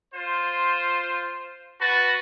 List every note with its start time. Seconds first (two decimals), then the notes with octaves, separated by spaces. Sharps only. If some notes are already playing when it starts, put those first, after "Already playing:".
0.13 F4 C5
1.79 F#4 B4 A5